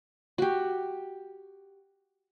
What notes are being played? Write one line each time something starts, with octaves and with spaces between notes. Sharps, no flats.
F#4 G4